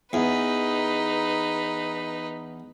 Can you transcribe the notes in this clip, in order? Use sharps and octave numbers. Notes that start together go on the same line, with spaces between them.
E2 D#4 B4